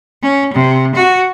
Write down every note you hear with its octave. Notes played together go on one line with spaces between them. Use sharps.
C#4
C3
F#4